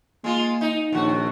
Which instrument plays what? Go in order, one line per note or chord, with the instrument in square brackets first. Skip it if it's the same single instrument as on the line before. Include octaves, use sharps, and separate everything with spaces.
[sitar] G#3 F4 [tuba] A#3
[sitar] D#4
[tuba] A#1 [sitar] D#2 F#4